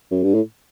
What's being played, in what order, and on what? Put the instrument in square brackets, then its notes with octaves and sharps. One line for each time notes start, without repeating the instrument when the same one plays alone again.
[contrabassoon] F#2
G2
A2